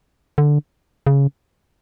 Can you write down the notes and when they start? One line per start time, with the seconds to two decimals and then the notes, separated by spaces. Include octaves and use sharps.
0.38 D3
1.07 C#3